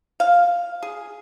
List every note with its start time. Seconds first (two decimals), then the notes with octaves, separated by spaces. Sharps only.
0.20 F5
0.83 G#4